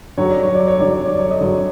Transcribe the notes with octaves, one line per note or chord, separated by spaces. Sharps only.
G2 D3 F#3 C#5
D5
C#5
D5
C#5
G2 D3 F#3 D5
C#5
D5
C#5
D#5
G2 D3 F#3 D5